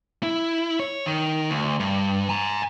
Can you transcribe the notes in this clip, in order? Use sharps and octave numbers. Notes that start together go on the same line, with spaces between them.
E4
C#5
D#3
D2
G2
G#5 A#5